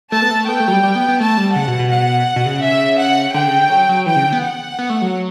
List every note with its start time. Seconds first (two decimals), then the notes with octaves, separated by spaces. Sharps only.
0.12 A3 A5
0.22 B3
0.31 A3
0.48 B3 G5
0.60 A3
0.68 F#3
0.73 G3
0.83 G3
0.95 B3
1.08 B3
1.20 A3 A5
1.37 G3
1.56 C#3 F#5
1.68 B2
1.79 B2
1.91 F#5
2.36 B2
2.46 C#3
2.63 E5
2.99 F#5
3.34 D3 G5
3.47 C#3
3.59 D3
3.70 F#3
3.89 F#3
4.06 E3 G5
4.16 C#3
4.25 D3
4.33 B3
4.43 F#5
4.79 B3
4.90 A3
5.02 F#3